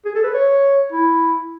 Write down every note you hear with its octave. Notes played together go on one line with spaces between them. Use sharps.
G#4
A4
B4
C#5
E4